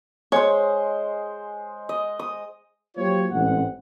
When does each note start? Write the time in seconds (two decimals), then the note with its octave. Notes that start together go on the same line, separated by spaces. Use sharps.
0.32 G#3 C5 C#5
1.89 D#5
2.19 D#6
2.96 F#3 A#3 F4 G4 C5 C#5
3.31 A1 G#2 C4 F#5